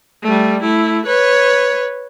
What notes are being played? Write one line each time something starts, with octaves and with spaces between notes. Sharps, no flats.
G3 A3
A3 E4
B4 C#5